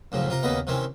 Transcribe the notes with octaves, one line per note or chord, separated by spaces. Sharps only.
F#2 A2 C#3 F3
C3 F4 A#4
D#2 C#3 A#3 B3 B4 D#5
C3 D#3 E3 C4 C#4